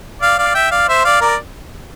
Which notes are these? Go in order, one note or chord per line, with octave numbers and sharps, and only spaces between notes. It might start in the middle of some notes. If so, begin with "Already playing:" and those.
D5 F5
D5 F5
E5 G5
D5 F5
C5 E5
D5 F5
A#4 D5